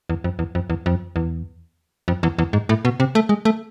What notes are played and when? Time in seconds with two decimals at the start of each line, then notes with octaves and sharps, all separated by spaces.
0.10 E2
0.24 F2
0.39 E2
0.55 F2
0.70 E2
0.86 F2
1.16 E2
2.08 F2
2.23 E2
2.38 E2
2.53 G#2
2.69 A2
2.85 B2
3.00 C3
3.15 A3
3.29 G#3
3.45 A3